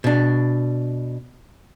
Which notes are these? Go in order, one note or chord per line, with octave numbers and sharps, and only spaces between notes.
B2 D4